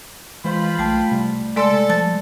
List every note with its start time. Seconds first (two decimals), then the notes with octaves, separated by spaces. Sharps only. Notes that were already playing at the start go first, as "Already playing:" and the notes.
0.44 E3 G#3 F4 C5 B5
0.79 B1 A3 G5 A5
1.12 C3 G3
1.56 G#3 A4 D5 C6
1.89 F3 A5 A6